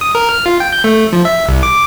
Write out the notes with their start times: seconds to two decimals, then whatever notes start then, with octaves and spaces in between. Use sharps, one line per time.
0.01 D#6
0.15 A#4
0.29 F6
0.46 F4
0.60 G5
0.73 G6
0.84 A3
1.13 F3
1.25 E5
1.49 C2
1.63 D6